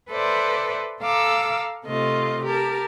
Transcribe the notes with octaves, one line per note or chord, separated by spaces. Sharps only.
A4 B4 C5 D5 E5
A4 F5 A#5 D6 E6
C3 A3 F4 D#5
G4 A#4 A5